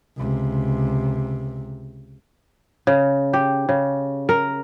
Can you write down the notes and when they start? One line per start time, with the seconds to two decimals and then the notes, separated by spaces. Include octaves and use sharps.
0.17 C#2 C3
2.87 C#3
3.33 G4
3.69 C#3
4.29 A#4